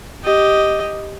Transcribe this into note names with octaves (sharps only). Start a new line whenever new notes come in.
G4 D#5